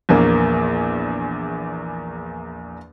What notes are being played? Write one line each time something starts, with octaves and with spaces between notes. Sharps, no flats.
A#1 E2 A#3